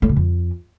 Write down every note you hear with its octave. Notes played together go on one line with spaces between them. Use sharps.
A2
C#3
F2